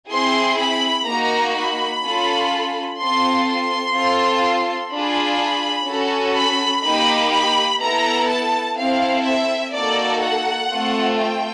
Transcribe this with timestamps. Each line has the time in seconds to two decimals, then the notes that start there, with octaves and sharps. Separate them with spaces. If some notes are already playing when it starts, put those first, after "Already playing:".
0.11 C4 E4 G#4 C6
0.59 B5
1.07 A#3 D#4 F#4 A#5
1.55 B5
2.04 C#4 F4 A4
3.00 C4 F4 A4 C6
3.48 C6
3.96 C4 F4 A4
4.92 D4 F4 G#4 B5
5.88 C#4 F#4 A4
6.36 B5
6.85 A#3 D#4 G4 B5
7.33 B5
7.81 B3 E4 A4 A#5
8.29 A5
8.77 C4 E4 A4 F5
9.26 E5
9.74 A#3 D#4 F#4 A4 D5
10.21 F#5
10.71 A3 C4 F4
11.18 G5